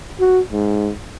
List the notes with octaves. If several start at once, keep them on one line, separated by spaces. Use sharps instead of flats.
F#4
G#2